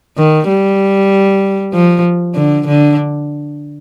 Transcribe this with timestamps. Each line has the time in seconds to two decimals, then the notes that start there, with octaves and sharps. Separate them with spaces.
0.17 D#3
0.48 G3
1.73 F3
2.35 D3
2.67 D3